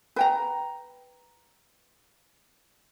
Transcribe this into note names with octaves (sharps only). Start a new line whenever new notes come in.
B4 G5 A#5